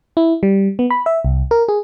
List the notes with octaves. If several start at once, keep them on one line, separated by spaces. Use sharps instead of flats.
E4
G3
B3
B5
E5
C2
A#4
G#4